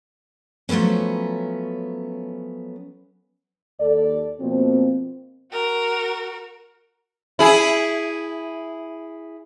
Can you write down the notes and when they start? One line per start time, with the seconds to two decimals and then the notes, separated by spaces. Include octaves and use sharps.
0.69 F3 F#3 A3 B3 C#4
3.80 D#2 A4 D5
4.40 B2 F3 A#3 C4
5.52 F#4 A#4
7.39 E4 G#4